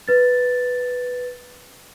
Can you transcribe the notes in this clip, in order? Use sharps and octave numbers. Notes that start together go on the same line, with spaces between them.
B4 A6